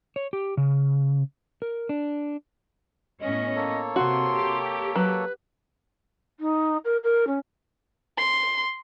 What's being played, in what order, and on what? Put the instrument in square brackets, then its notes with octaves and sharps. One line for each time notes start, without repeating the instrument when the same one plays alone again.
[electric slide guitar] C#5
G4
C#3
A#4
D4
[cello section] A2 B3 C#4 [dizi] D#5
[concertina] A#3 A4 C#5
[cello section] C3 [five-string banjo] F#4 [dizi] C6
[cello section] G4
[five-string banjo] F#3 [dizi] B4
[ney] D#4
A#4
A#4
C#4
[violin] C6